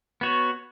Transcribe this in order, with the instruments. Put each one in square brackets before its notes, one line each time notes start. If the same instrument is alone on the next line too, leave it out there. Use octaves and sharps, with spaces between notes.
[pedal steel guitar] B3 F#4 C#5